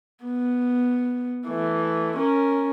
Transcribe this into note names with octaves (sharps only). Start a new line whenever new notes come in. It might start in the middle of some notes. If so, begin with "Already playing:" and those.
B3
E3 A3
C#4 A#4